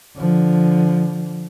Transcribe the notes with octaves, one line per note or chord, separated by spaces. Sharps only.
D3 F3